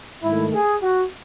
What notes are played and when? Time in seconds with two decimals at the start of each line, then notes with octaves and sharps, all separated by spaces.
0.24 G#2 D#3 A3 E4
0.54 G#4
0.83 F#4